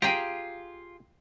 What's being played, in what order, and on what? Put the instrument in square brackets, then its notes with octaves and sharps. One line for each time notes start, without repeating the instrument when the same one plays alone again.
[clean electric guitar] F4 [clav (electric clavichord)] G4 G#4 [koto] G5 G#5 A#5